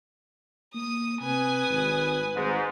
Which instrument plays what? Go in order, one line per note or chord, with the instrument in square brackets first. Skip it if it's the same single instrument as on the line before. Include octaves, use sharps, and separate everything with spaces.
[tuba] A#3 [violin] D#6 D#7
[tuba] C3 [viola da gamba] B4 [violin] G#5 D#6
[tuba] G#1
[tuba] G#1 [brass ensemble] G#2